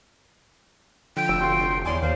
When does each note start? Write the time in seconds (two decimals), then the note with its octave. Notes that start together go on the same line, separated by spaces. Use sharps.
1.16 D3 F3 G5
1.29 F1 E6
1.41 D3 F4 F#4 C6
1.85 E2 C#5 D5 G#5 C6
2.02 D#2 C5 F5